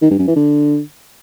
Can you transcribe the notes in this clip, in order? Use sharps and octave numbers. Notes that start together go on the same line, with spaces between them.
D#3
G2
F#2
E3
D3